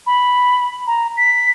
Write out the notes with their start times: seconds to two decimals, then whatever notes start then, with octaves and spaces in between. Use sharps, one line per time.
0.07 B5
0.87 A#5
1.17 B6